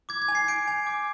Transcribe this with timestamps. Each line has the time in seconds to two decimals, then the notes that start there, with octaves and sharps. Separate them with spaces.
0.09 D6 G#6
0.22 G#6
0.28 G#5
0.35 C7
0.48 G6 D7
0.68 G#5
0.87 D6